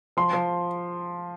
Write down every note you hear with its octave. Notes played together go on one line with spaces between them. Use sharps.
F3 C6
F3